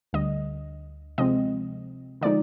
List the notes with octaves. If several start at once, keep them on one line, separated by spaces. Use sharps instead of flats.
D2 D3 G3 D#5
C3 F3 G#3 C4 D#5
D3 F3 G#3 D#4 D5